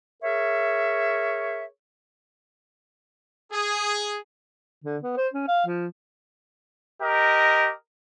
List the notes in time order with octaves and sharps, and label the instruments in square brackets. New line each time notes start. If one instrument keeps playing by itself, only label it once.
[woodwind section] G#4 A#4 C#5 E5
[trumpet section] G#4
[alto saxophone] D3
B3
C5
C#4
F5
F3
[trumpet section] G4 A#4 D#5